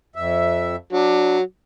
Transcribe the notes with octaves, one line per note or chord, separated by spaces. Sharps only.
F2 E5
F#3 D4